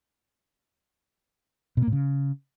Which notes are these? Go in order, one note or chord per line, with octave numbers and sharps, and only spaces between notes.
B2
A#3
A2
C#3